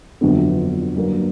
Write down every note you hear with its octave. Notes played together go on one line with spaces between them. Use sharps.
G1 F2 D3 F#3 B3
G2 D3 F#3 A#3 D4